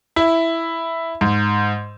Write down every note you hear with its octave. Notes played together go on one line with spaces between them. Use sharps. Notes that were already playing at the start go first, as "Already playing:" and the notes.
E4
G#2